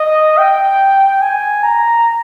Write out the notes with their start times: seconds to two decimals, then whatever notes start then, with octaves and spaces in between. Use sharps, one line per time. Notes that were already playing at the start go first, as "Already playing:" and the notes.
Already playing: D#5
0.38 G5
1.21 G#5
1.63 A#5